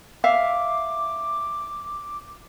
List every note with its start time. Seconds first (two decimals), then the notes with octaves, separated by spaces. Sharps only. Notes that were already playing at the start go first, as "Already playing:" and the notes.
0.24 E5 F5 D6